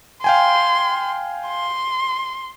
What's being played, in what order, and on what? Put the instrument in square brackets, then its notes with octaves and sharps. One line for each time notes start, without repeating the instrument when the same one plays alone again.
[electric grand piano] F5 G5 G#5 [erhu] C6
[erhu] C6